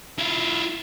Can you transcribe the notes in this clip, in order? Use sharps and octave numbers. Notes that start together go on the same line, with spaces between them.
E4 F4